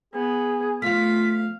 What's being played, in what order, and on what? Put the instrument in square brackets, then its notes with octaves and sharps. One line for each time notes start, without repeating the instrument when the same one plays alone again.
[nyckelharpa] B3 [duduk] G#4
[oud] F3 A3 [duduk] F4 [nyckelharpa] F5 [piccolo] B6